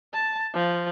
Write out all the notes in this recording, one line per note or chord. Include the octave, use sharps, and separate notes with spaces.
A5
F3